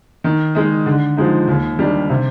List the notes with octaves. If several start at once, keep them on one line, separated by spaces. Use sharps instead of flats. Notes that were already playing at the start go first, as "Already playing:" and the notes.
D#3
G#3 D#4
D3
F3 G#3 D#4
D#2
D#3 G3 D4
C3